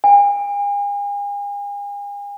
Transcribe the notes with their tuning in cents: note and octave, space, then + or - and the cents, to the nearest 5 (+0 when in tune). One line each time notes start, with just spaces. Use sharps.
G#5 -40